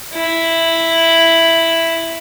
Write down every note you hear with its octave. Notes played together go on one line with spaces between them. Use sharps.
E4